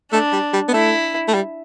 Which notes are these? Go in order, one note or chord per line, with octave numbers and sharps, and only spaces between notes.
A3 D4
G3
G3
B3
A3 E4
A3
G3